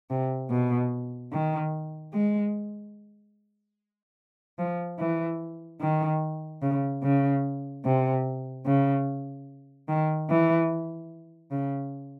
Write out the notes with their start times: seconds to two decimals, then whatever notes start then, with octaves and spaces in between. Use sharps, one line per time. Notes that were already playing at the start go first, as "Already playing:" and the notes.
0.10 C3
0.51 B2
1.32 D#3
2.14 G#3
4.58 F3
4.99 E3
5.81 D#3
6.62 C#3
7.03 C#3
7.85 C3
8.66 C#3
9.89 D#3
10.29 E3
11.51 C#3